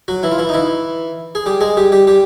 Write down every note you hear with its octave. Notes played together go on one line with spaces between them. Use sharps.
F#3 F#4
E3 E4
F4
E3 E4
D#4
E3 E4
G#4
G3 G4
G#3 G#4
G3 G4
G3 G4
G3 G4